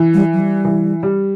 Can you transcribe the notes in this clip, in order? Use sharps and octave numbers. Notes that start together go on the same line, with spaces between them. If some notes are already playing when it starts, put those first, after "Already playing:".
Already playing: E3
G3
F#3
G3
E3
G3